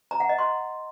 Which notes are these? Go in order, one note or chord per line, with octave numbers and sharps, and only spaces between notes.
A#5
F#5
D#5
C6